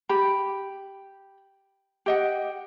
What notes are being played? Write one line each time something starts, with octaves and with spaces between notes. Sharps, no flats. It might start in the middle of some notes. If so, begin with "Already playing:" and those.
G4 B5
G4 D#5 F#5